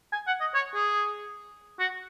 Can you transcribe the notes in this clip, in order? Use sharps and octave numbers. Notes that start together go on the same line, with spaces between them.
G#5
F#5
D#5
C#5
G#4
F#4